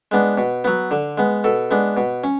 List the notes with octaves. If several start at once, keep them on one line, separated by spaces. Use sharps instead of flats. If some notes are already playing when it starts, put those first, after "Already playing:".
G#3 B3 D4
B2
F#3 B3
D3
G#3 B3
B2 A4
G#3 B3 D4
B2
C#4